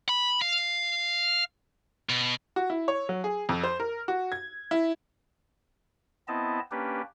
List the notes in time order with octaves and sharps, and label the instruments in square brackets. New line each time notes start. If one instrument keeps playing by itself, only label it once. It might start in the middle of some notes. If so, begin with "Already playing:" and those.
[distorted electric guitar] B5
F5
B2
[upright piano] F#4
E4
C#5
F#3
G#4
F2
C5
A#4
F#4
G#6
E4
[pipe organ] B3 C4 E4 D#5 A5
A#3 C#4 D4 G4 B4